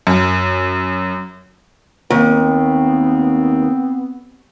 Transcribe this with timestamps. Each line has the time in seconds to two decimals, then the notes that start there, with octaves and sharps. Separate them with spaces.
0.07 F#2
2.10 D#2 B3 C4